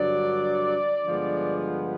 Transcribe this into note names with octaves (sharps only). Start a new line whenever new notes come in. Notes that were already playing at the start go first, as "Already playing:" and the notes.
Already playing: G2 D3 F#3 D5
G2 D3 F3 G#3 B3